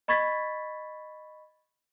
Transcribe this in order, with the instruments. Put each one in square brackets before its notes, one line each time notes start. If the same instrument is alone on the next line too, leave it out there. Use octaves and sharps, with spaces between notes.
[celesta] D#5 B5 C#6 G#6 A6 B6